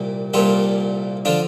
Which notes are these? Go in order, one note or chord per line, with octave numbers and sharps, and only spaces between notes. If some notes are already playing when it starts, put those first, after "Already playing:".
Already playing: C2 A#2 G3
C2 A#2 G3 F4 A4
D3 F3 D4 F4